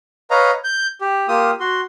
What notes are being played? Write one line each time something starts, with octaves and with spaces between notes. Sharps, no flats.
B4 C#5 D#5 F5 A#5
G6
G4
A#3 F4 G4 D#6
F#4 C6